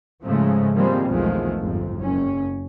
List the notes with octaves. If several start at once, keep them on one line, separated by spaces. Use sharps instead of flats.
G#2 C#3 F3 G#3 A3
D#3 F3 G3 G#3 A#3 C4
B1 E2 D#3 F3 G#3 A3
G1 F2 G#2
F#1 C#4